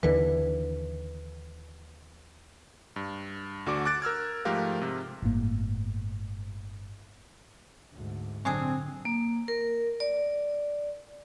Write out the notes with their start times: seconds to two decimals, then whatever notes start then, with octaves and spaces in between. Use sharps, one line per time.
0.03 D#2 D3 E3 B4
2.96 G2
3.66 D2 D3 F#4 D5 D6
3.85 D6 F#6 A6 D7
4.02 A#4 E6 F6 G#6
4.45 G#2 F3 A3 G4 A#4 F5
4.80 G#2 C3
5.22 G1 A2 A#3
7.94 D2 G#2
8.45 A#1 D3 F#3 G#3 C4 D4 G#4
9.05 A#3
9.48 A#4
10.00 D5